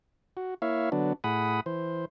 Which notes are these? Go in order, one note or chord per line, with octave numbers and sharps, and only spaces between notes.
F#4
A#3 E4 C#5 E5 F5
D3 F#3 B3 D4
A2 G#4 F#5 B5 D#6
E3 C5